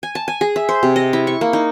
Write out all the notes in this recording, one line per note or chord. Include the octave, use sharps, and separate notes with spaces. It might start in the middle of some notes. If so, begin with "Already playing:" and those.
G#5
A5
G#5
G#4
E5
C5
C3
D#5
E4
C#6
A#3
D#4